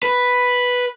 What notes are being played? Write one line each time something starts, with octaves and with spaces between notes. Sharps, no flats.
B4